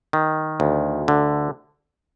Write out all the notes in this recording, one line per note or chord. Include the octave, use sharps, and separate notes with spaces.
D#3
D2
D3